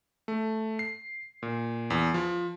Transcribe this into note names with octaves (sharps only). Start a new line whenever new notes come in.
A3
C7
A#2
E2
F3